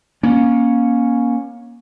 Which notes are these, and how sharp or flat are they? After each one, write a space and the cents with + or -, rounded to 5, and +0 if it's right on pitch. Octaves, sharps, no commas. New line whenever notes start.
A#3 +30 C#4 +0